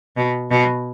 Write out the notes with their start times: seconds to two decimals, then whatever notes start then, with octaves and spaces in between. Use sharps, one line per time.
0.17 B2
0.51 B2